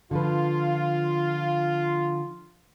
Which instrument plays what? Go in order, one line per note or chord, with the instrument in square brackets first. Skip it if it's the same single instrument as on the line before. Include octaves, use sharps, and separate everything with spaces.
[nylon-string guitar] D3 F3 B4 [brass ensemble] F4